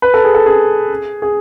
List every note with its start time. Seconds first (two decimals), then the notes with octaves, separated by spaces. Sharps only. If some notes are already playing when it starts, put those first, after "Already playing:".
0.02 B4
0.14 A4
0.24 G#4
0.34 A4
0.46 G#4
1.22 G#4